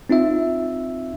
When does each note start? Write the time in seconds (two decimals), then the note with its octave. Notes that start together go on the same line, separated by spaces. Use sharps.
0.09 C4 D#4 F4 E5